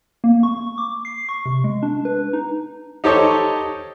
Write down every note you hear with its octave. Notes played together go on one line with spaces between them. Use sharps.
A#3
C#6
D6
C7
C#6
C3
G#3
D4
B4
D#4
D#4 G4 A4 C5 C#5 D#5